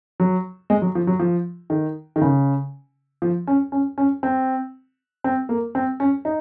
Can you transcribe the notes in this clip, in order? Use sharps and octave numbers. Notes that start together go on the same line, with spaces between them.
F#3
G#3
F#3
F3
F#3
F3
D#3
D#3
C#3
F3
C#4
C#4
C#4
C4
C4
A#3
C4
C#4
D#4